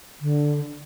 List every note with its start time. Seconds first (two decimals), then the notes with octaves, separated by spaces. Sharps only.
0.21 D3